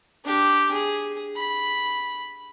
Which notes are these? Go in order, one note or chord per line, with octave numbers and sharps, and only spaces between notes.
D4 G4
G#4
B5